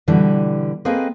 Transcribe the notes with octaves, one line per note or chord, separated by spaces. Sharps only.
B2 D3 E3 G3
A#3 C4 G#4 A4 B4 D#5